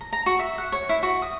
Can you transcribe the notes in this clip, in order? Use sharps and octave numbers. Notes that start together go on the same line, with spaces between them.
A#5
A#5
F#4
E5
F#5
C#5
E4
F#4
D#6